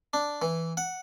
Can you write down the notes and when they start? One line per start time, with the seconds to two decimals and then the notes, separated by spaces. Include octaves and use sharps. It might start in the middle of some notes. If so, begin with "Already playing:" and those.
0.13 D4
0.42 E3
0.77 F#5